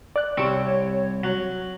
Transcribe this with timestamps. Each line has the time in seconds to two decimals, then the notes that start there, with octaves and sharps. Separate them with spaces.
0.16 D5 F#6
0.37 C2 C4 G4 C#5 C#6 E6 D7
1.24 F#3